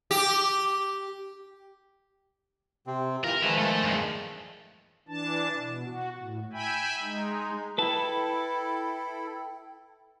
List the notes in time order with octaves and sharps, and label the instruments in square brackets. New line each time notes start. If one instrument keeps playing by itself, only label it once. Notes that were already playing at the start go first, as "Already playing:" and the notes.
[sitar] G4
[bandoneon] C3 C4
[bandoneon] E3 F4 [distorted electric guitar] A#4
[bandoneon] D#3 F3 G#3 [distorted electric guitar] B4 E5
[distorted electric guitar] A3
E2 G2
[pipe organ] E3 D4 A5
B2
F#4
A2
E5 G5 G#5 B5
G#3 D#4
[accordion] E4 A4 [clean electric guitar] B4 A5 [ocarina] G5